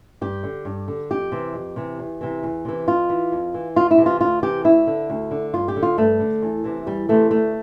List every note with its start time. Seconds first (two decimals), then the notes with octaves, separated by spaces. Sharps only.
0.21 G2 G4
0.43 D3
0.65 G2
0.88 D3
1.10 F2 G4
1.32 C3 E3
1.54 F2
1.76 C3 E3
1.99 E2
2.21 C3 E3
2.43 E2
2.65 C3 E3
2.87 F2 F4
3.09 E3
3.32 F2
3.54 E3
3.76 D2 F4
3.91 E4
3.98 C3 E3
4.06 F4
4.21 D2 F4
4.43 C3 E3 G4
4.64 D2 E4
4.87 D3
5.10 D2
5.31 D3
5.54 G2 F4
5.68 G4
5.76 D3
5.82 F4
5.98 G2 A3
6.20 D3
6.42 E2
6.64 C3 E3
6.86 E2 G3
7.09 C3 E3 A3
7.31 D2 A3